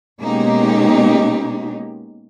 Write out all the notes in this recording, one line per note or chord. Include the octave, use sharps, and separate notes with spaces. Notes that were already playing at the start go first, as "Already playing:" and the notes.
B2 G#3 A#3 C#4 D#4 G4